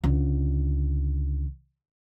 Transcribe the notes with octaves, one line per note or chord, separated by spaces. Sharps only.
C#2 D3